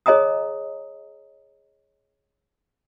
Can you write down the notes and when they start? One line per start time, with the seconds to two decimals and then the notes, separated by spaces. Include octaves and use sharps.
0.06 G#4 C#5 D#5 G#5 A#5 D#6